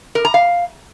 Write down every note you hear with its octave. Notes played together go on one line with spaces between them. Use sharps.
A#4
A#5
F5